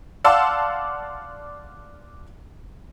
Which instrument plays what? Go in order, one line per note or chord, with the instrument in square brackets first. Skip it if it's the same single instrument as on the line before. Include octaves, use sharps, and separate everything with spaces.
[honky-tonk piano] D5 F5 F#5 A5 C6 E6